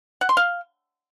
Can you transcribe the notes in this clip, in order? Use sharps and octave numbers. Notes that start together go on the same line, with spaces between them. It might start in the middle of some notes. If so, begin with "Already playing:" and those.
F#5
C6
F5